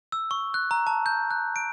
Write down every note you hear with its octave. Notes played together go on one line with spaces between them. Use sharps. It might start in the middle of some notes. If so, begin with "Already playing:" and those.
E6
C#6
F#6
A#5
A5
G6
F#6
D7